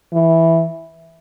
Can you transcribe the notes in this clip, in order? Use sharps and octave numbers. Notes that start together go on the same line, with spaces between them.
E3